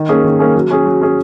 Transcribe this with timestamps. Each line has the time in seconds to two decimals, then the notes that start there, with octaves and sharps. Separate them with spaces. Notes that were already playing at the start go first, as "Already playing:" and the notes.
Already playing: D#3
0.09 A#3 C#4 G#4
0.24 D#3
0.39 A#3 C#4 G#4
0.55 F#3
0.71 C#4 G#4
0.86 F#3
1.01 C#4 G#4